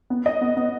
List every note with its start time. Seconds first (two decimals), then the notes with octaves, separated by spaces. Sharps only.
0.10 B3
0.26 D#5
0.41 B3
0.57 B3